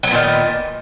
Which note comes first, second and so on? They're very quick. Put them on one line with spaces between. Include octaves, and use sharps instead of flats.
F#3 B3 A#2 D#3